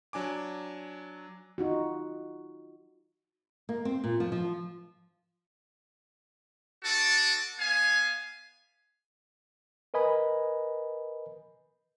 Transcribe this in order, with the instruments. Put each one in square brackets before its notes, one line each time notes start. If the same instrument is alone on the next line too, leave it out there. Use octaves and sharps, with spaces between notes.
[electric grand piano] F#3 D4 G#5 D6
[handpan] D#4 F4 F#4
[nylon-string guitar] A#3
C4
A#2
F3
F3
[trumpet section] D4 F#4 A4 A5
B3 F5 G#5
[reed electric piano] A#4 B4 D#5 G#5 B5